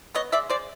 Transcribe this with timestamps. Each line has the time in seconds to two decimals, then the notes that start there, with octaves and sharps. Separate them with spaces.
0.15 B3 C#5 D#5
0.32 G#3 D5 E5
0.50 G#3 C5 D5